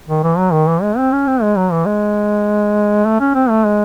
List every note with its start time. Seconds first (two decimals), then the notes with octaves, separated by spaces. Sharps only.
0.08 D#3
0.23 E3
0.38 F#3
0.52 D#3
0.67 E3
0.82 G#3
0.97 C4
1.12 C#4
1.27 C4
1.42 G#3
1.57 F#3
1.72 E3
1.86 G#3
3.06 A3
3.20 C#4
3.34 C4
3.50 A3
3.64 G#3